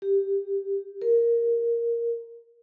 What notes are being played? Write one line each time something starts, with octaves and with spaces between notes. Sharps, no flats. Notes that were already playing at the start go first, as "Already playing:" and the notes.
G4
A#4